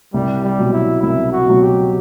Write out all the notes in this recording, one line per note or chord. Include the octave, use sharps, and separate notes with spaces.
C2 G3
G3
B2 F#3
E4
C2 E4
F#4
B2 F#3
G4